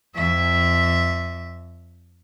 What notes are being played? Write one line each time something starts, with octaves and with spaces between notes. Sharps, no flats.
F2 E5